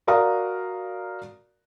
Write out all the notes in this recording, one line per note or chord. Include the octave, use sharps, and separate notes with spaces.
F#4 A#4 D5 F5 A#5 D#6